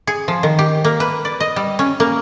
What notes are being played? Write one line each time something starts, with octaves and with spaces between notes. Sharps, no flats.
G#4
F3
D#3
G4
A#3
B4
D5
D#5
G3
C#4
A#3